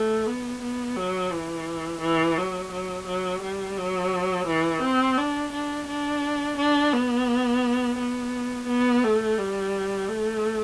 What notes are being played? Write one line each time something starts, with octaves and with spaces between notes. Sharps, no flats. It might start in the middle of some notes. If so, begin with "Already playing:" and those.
Already playing: A3
B3
B3
F#3
E3
E3
F#3
F#3
F#3
G3
F#3
E3
C4
D4
D4
D4
D4
B3
B3
B3
A3
G3
A3